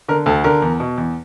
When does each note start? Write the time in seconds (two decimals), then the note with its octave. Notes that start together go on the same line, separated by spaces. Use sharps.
0.08 D3 A#4
0.26 D2 A4
0.44 D3 A#4
0.62 E2
0.80 B2
0.98 E2